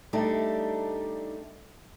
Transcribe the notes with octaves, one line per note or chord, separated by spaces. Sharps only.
G3 A3 D4 D#4 G4